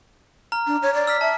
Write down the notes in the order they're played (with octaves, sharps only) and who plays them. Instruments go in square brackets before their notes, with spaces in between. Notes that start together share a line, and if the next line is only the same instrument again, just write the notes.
[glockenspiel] A#5 F6
[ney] D4
C#5
D5
[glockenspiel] E6 F6 B6
[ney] E5 [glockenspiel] A5